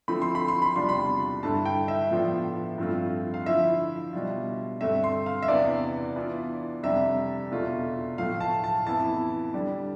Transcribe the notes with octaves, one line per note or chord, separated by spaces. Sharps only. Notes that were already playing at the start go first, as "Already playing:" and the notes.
D3 F3 A3 C4 E4 B5
C6
B5
C6
B5
E2 C3 G3 D4 F4 C6
B5
G2 D3 A3 E4 A5
G5
E5
A2 F3 B3 D4 F4
G2 F3 A3 C4 F4
F5
D3 F3 A3 E4 E5
B2 G3 D4 F4
G2 D3 A3 C4 E5
C6
F5
E5
E2 C3 E3 B3 D4 D5
E3 B3 D4 F4
F2 C3 G3 D4 E5
E2 B2 A3 D4 F4
A2 F3 A3 F5
A5
A5
F2 E3 B3 E4 A5
D3 G3 D4